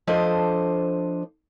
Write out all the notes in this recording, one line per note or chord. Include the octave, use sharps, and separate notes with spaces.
F3 D4 A4 C5 D#5